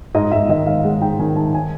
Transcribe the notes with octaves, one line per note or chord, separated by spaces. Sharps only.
G#2 D#5
G#2 E5
D#3 D#5
G#2 F5
G#3 F#5
G#2 G5
D#3 G#5
G#2 A5
G#5